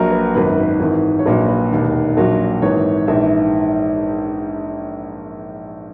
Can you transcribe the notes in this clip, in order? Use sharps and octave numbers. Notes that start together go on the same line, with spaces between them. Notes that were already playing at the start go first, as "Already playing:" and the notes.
Already playing: A#1 A#2 F#3 A#4
B4
G#1 F#2 D#3 B4
B4
G#1 G#2 E3
C#5
A#1 A#2 F#3 B4
B4
E1 D#2 D#3
A#1 A#2 F#3
G#1 G#2 E3 C#5
A#1 G#2 E3 E5